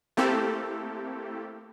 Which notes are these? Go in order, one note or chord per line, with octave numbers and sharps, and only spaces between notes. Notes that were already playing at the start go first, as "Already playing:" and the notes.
A3 A#3 C4 E4 G4 A4